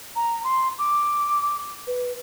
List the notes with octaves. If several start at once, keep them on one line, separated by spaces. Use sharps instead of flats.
A#5
C6
D6
B4